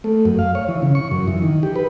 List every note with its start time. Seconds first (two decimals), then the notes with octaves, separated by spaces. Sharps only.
0.04 A3
0.25 F#2
0.39 F5
0.55 C#5
0.68 E3
0.82 C#3
0.95 C#6
1.11 F#2
1.28 E3
1.42 D#3
1.63 G4
1.76 B4